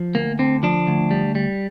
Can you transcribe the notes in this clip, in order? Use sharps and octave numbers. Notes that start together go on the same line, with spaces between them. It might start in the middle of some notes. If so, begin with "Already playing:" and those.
Already playing: F3
D2 A#3
D3 C4
F3 D4
D2
G3
G3